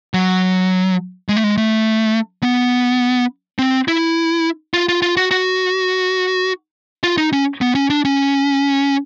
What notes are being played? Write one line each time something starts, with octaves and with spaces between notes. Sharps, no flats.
F#3
G#3
A3
G#3
A3
B3
C4
E4
F4
F4
F4
F#4
F#4
F4
D#4
C#4
B3
C#4
D4
C#4